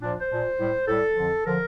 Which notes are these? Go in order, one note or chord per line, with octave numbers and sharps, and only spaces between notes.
A#2 F3 D4
C5
A#2 F3
A2 G3
A2 G3 A4
F2 D3 F3
D3 F3 A#4